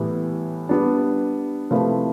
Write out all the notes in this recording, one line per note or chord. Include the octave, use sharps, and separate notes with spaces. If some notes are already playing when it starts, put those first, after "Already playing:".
Already playing: A2 E3 G3 B3
G3 B3 D4
C3 F3 A3 E4 B4